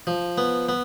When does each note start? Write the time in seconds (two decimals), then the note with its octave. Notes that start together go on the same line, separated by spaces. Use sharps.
0.07 F3
0.38 B3
0.69 B3